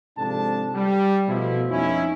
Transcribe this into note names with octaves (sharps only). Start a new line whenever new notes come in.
G#2 C3 F3 D4 A4 A5
G3
B2 F3 A3 E4
F2 C#4 D#4 E4